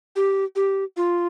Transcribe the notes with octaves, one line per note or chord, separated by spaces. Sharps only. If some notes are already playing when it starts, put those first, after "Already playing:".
G4
G4
F4